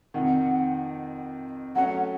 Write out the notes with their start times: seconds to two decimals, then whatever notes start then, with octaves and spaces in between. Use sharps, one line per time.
0.14 F2 C3 D#3 F#5
1.75 F#3 A3 C#4 F#5